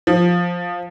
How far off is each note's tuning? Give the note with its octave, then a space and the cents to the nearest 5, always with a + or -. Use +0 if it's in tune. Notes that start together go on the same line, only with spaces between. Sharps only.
F3 +5